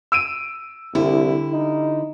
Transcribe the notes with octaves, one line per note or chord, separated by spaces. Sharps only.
E6 D7 D#7
C2 D3 G3 E4
D#4